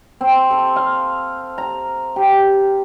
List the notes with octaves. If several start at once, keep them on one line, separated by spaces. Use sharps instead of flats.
C4
A4
F5
A#5
G4